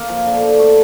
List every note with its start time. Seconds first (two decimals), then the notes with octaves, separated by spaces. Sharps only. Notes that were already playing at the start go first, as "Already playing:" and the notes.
Already playing: A#3
0.09 F3
0.26 D3
0.43 D3
0.59 A3